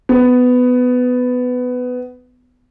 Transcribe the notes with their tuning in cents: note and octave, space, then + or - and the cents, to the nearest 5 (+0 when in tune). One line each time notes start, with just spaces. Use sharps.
B3 +15